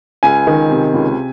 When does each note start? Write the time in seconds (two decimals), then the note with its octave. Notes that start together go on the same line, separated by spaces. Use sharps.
0.23 C#2 G#5
0.47 D#3
0.70 C3
0.94 C#2